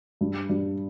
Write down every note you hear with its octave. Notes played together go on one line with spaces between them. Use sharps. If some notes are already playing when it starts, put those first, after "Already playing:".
G2
G2